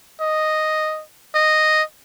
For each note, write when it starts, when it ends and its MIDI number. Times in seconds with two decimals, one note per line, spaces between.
0.21 1.02 75
1.35 1.83 75